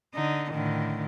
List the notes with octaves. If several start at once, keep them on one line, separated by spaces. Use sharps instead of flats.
D3 D#4
A2 D3 D#3